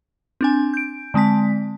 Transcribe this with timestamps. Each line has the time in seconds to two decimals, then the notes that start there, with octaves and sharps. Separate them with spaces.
0.41 C4 D4 G#5
0.74 G6 D7
1.14 D3 G#3 C4 A5 B6